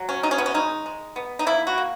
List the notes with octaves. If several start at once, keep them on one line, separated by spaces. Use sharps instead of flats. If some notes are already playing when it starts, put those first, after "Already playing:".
Already playing: F#3
C#4
D#3 D#4
C#4
B3
C#4
G#3 D#4
G#3
B3
D#4
A#3 E4
F#4
A#3